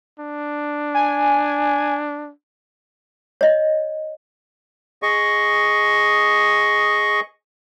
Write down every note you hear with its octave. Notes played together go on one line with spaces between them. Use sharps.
D4
G#5
C#5 D#5
G#4 D#5 C#6